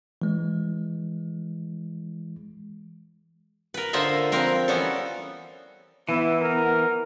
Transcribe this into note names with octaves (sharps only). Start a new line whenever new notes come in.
E3 G#3
A#4 B4
D3 A#3 F4 C5 D#5 E5
F3 C4 A#4 B4
E3 G3 B3 C#4 A4
E3 B3 E4
A#4